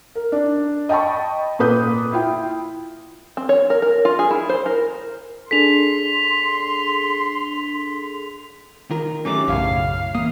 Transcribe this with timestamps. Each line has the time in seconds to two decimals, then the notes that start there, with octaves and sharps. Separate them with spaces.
0.15 A#4
0.32 D4
0.89 D#5 G5 A5 B5 C#6
1.59 A#2 A4 B4 D#6 G6
2.12 E4 F4 G5
3.37 C4
3.49 C#5
3.70 A#4
3.82 A#4
4.05 F4
4.19 G#4
4.31 E4
4.49 C5
4.66 A#4
5.51 D4 G#4 A4 C6 B6 F7
8.91 D#3 F4 A#4
9.25 G#2 F#3 A3 C#4 D#4 G4 D6
9.48 B1 F#2 A2 C#3 C#5 E5 F5
10.15 E3 A#3 D#6